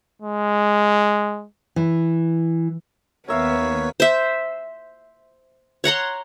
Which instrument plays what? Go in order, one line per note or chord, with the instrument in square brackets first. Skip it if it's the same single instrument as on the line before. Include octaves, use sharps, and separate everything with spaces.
[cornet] G#3
[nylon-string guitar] E3
[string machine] D#2 B4 B6 [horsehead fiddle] B3 [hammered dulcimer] A#4 E5 F5 [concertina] C#5
[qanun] C5 E5
C#5 F#5 A#5 C6